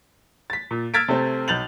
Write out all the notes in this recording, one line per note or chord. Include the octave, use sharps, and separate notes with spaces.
A6 B6
A#2
E6 F6 G#6 A6 B6 D7
C3 A3 C4
B1 G6 A6 F7 F#7